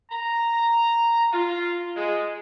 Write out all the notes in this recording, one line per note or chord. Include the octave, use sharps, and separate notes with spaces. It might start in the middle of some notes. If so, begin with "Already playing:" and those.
A#5
F4
G#3